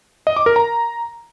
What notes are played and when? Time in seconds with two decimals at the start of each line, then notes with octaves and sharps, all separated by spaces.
0.27 D#5
0.36 D6
0.46 A#4
0.56 A#5